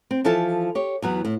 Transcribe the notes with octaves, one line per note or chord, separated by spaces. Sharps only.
C4
E3 F3 E4 A4 F5 A5
G4 C#5
E2 F#3 B3
A2